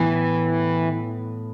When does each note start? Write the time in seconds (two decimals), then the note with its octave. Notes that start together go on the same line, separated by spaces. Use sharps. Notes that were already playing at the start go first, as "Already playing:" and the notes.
Already playing: A2 E3 B3